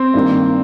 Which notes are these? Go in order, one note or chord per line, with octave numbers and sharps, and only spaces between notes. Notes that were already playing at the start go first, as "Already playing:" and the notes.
Already playing: C4
G2 D#3 G3 A#3